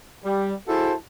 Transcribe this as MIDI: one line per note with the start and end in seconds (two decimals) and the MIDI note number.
0.25 0.54 55
0.68 0.93 64
0.68 0.93 66
0.68 0.93 68
0.68 0.93 69
0.68 0.93 72
0.68 0.93 81